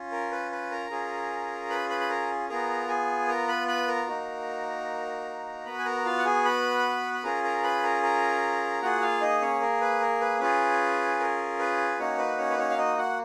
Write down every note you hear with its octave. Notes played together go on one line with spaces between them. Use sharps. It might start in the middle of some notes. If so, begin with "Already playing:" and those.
Already playing: C#4 F4
A#4
B4
B4
A#4 A#5
C#4 F4 G#4
B4 B5
B4 B5
B5
A#4 A#5
B3 F4 G#4 A#4 A#5
G#4 G#5
A#4 A#5
B4 B5
B4 B5
A#4 A#5
A#3 D#4 F#4
B3 F#4 B4 B5
G#5
A#4 A#5
F4 F5
F#5
G#4 G#5
B4 B5
B5
C#4 F4 G#4 A#4 A#5
A#4 A#5
B4 B5
A#4 A#5
A#4 A#5
A#3 F4 F#4 G#4 F#5
F4 F5
D#4 D#5
C#4 C#5
A#4
B4
A#4
B4
C#4 F4 G#4 B4
A#4
B4
A#3 C#4 D#4 F#4 C#5
B4
C#4 C#5
B4
C#4 C#5
F5
D#4 D#5
F#4 F#5